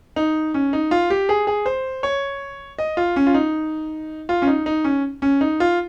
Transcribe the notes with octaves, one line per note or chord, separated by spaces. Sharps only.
D#4
C#4
D#4
F4
G4
G#4
G#4
C5
C#5
D#5
F4
C#4
F4
D#4
F4
C#4
D#4
D#4
C#4
C#4
D#4
F4